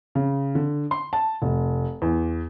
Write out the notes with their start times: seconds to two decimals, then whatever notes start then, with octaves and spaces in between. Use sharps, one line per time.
0.15 C#3
0.55 D3
0.91 C6
1.13 A5
1.42 F1
2.02 E2